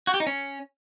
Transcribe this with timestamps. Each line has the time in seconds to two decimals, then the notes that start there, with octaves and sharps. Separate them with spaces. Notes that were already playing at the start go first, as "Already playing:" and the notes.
0.07 F#4
0.14 G4
0.20 D#4
0.27 C#4